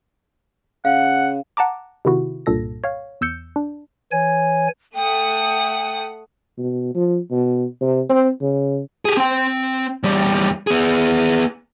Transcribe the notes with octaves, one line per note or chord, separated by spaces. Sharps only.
C#3 F5 F#5
F#5 A5 A#5 D6
C3 D#3 E4 F#4
C2 G2 A#2 A4 A#6
C#5 F5
E2 E6 G6 C#7
D4
E3 C#5 G#5 G#6
A3 F#5 G5 D#6
B2
F3
B2
C3
C4
C#3
G4 G#4
C4 G5
E2 G3
B3 G#4